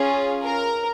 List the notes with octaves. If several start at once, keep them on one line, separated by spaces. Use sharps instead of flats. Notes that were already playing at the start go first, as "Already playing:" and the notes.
Already playing: C#4 F4 G#4
A#4